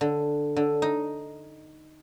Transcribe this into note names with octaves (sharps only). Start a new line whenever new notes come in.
D3
D3
D#4